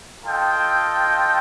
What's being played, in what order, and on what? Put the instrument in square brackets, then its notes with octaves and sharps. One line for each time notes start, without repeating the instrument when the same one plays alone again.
[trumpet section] F4 A4 D#5 G5